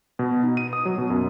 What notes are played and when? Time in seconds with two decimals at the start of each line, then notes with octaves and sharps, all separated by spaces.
0.19 B2
0.43 D#4
0.57 D#7
0.73 D#6
0.85 F#3
0.98 B2
1.10 F#2